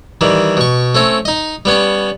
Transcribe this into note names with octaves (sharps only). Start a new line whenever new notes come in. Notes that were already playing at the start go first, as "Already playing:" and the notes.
D#3 E3 G3
B2 C#6
A3 C4 C#4
D#4 D#5
G3 B3 C#4